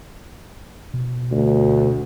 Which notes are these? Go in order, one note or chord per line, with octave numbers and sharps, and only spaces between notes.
B2
D2